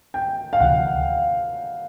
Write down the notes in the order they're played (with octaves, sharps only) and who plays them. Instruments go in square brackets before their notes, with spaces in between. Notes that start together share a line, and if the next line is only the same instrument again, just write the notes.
[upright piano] G5
F5
[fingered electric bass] D2 C3 E3 [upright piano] F#5